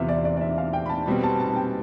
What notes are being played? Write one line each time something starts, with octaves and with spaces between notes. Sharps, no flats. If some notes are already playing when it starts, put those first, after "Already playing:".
Already playing: E2 C3 E3 B3 F4 E5
D5
D5
D5
E5
F5
G5
B5
A5
B2 G3 C4 B5
A5
A5
G5